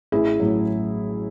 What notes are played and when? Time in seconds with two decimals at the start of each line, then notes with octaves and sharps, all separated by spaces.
0.12 A1 E4 G#4
0.40 A2 F#3